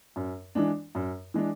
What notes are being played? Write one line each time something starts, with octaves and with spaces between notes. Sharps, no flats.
F#2
E3 G#3 D4
F#2
E3 G#3 D4